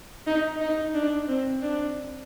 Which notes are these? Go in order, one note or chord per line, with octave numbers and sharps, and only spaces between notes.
D#4
D#4
D4
C4
D4